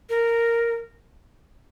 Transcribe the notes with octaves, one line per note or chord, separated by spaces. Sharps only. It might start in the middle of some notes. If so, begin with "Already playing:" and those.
A#4